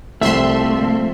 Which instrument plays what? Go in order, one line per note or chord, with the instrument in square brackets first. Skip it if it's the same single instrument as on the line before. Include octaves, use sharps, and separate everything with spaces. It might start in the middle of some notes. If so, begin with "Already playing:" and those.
[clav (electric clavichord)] C2 [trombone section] F3 C4 [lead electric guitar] A3 [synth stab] E5 C6